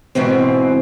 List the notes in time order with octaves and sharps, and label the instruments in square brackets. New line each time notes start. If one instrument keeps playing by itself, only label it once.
[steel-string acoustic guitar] G#2 B2 E3 C4